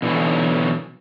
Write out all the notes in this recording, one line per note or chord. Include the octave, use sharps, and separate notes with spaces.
B2 D3 E3 F#3